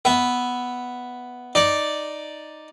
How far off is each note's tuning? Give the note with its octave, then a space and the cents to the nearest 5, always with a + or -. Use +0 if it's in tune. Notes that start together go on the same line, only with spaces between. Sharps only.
B3 +0 E5 +0
D#4 +0 D5 +0